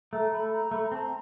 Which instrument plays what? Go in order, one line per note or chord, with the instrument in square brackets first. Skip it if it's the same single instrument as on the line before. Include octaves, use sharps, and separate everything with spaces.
[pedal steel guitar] A3 [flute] A#5
[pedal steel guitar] A3 [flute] B5
[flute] A#5
[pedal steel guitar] A3 [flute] B5
[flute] A#5
[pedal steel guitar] C4 [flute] A5
[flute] A#5